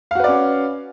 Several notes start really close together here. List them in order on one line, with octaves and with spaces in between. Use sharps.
F5 F#4 B4 D5 C#4